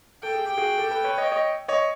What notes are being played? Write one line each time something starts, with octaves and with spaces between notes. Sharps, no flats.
A4 G5
G#4
G4
F#4 G#4
G4 A4
A4 B4
B4 C#5
C#5 D#5
C#5 D#5
C#5 D#5